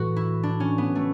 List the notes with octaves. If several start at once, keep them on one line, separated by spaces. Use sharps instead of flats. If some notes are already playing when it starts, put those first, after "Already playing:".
Already playing: A2 E3 F#4
E4
D4
C#4
B3
A3